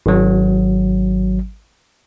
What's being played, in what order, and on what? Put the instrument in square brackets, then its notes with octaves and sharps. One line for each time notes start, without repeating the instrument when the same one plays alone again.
[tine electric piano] G#1 F#3